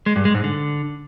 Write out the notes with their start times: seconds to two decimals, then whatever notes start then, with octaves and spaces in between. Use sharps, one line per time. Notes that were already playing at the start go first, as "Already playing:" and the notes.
0.06 G#3
0.16 G2
0.25 G#3
0.35 G#2
0.44 D3